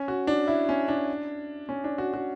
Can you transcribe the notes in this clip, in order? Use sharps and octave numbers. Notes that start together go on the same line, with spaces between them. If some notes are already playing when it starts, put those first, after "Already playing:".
Already playing: C#4
F#4
D4
E4
C#4
D4
C#4
D4
F#4
F#4